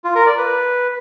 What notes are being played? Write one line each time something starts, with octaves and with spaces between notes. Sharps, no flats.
F4
A#4
D5
B4